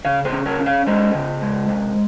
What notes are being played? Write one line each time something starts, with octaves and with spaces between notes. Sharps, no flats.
C#3 C#5 F5
G#4 C5
C#4
A#4 C#5
C#4
C#5 F5
G#3 C5 D#5
C#3
G#3
C3